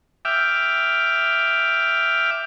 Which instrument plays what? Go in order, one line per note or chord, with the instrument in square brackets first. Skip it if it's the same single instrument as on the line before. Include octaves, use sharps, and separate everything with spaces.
[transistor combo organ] E5 G5 D6 F6